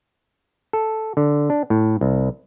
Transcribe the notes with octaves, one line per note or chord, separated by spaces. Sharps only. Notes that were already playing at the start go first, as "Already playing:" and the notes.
A4
D3
D4
A2
C2